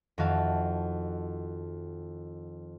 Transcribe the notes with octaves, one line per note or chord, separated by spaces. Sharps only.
F2 D#3 E4 F#4 F5 A5